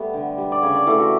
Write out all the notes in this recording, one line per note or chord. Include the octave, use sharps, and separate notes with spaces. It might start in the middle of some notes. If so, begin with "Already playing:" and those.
Already playing: G3 A3 B3
D3
G3 B3
D5
C#3 C#5
D5
E3 A3 E5
F#4